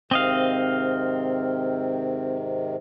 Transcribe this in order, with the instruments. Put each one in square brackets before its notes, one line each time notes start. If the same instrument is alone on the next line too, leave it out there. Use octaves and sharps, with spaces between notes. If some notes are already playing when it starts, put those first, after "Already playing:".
[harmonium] G#2 C3 D#3 [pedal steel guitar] C4 D#5 F5